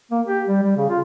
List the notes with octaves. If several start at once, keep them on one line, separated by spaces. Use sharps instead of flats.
A#3
G4
G3
G3
C#3
F4